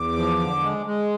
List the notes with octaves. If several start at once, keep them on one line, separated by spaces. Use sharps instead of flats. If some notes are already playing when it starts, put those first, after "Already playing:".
Already playing: E2 D6
F3
D3
G#3
G#3